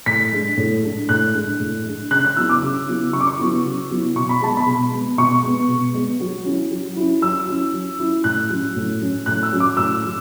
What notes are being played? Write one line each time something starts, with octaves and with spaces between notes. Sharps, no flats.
A2 B6
G#3 D4
A2
G#3 D4
A2 F#6
G#3 D4
A2
G#3 D4
C#3 F#6
F#6
F#3 B3 E4 E6
D6
C#3
F#3 B3 E4
C#3 C#6
D6
C#6
F#3 B3 E4
C#3
F#3 B3 E4
B2 C#6
B5
G#3 B3 A5
B5
B2
G#3 B3
B2 C#6
G#3 B3
B2
G#3 B3
F#3
C#4 E4
F#3
C#4 E4
F#3 E6
C#4 E4
F#3
C#4 E4
A2 F#6
F#3 C#4
A2
F#3 C#4
A2 F#6
E6
F#3 C#4
D6
A2 E6
F#3